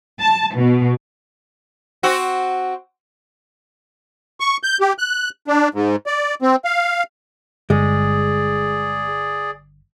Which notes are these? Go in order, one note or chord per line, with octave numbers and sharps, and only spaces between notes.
A5
B2
C4 F#4
C#6
G6
G4
F#6
D4
G#2
D5
C4
F5
G1 G2 D3 G#3 G#4 D5